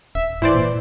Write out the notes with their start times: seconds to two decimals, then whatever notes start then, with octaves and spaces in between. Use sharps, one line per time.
0.15 D#1 E5
0.42 G#2 E3 C5 D5
0.55 A#2